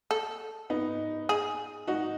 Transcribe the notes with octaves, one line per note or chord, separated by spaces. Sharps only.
A4
B3 D#4
G#4
D#4 F#4